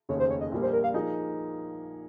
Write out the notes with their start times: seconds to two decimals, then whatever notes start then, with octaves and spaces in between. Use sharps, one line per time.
0.09 F1 D#2 C#3 C#5
0.20 C5
0.30 C#5
0.41 D#5
0.51 A#1 A#2 G3 A#3
0.62 C5
0.73 A#4
0.84 F5
0.94 F3 A#3 D#4 G#4 D#5